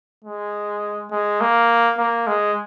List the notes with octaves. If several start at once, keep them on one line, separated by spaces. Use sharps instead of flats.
G#3
G#3
A#3
A#3
G#3